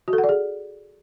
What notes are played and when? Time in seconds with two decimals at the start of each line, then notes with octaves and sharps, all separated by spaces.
0.08 F#4
0.13 A4
0.18 F#5
0.24 D5
0.29 G#4